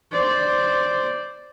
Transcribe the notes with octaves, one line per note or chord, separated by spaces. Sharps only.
C5 D5